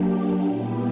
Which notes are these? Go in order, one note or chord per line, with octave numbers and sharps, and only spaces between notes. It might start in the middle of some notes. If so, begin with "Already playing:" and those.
Already playing: F#3 A#3 D4 G4
A#2 G3 B3 E4 G4